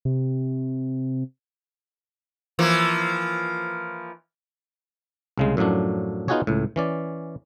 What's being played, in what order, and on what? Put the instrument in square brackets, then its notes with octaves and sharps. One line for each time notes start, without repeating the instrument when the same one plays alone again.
[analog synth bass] C3
[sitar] E3 F3 A#3
[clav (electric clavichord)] C2 C#3 G#3
F#2 A2 F3 F#3 D4
B3 D#4 F4 F#4 G#4 C#5
C#2 A2
E3 C#4 D5